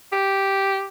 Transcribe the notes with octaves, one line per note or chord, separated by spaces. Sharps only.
G4